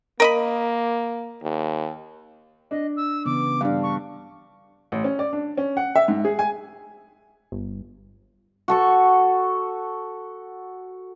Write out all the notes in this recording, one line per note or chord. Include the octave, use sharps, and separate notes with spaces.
A#3 A#4 D#5 B5
D#2
D4 D#5
E6
C#3 E3 B3 D6
G2 D4 F5
C#6
A1
C#4
D5
D4
C#4
F#5
E5
G#2
G#4
G#5
G1
F#4 A4 C#6